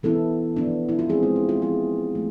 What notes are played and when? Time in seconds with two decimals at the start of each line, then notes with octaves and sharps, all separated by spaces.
0.03 E3 B3 E4 A4
0.56 F3 B3 D4
0.89 E4
0.99 F4
1.09 F3 G#3 C4 G#4
1.23 F4
1.36 E4
1.49 F4
1.62 F3 B3 E4 G#4
2.15 F3 A3